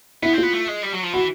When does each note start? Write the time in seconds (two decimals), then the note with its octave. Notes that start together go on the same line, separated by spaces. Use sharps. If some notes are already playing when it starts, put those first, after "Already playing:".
0.23 B3 E4
0.33 C4
0.38 B3 F4
0.53 A3
0.68 G#3
0.83 G3
0.93 F#3
1.03 F3
1.13 E3 F#4